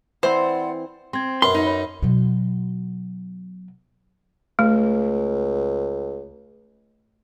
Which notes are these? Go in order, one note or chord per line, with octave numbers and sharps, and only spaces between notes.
E3 C4 C5 D5 F#5 B5
C4 C6 G#6
F#2 A#4 B4 C6
D#4
C#5 B5
B2 F#3
C#2 A3